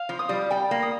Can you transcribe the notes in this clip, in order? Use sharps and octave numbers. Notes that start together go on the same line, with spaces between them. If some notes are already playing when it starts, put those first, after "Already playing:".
Already playing: F5
F3
D#6
G3
G3 G5
A#3
D#6